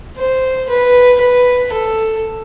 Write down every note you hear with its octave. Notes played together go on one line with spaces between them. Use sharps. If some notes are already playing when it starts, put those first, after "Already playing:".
C5
B4
B4
A4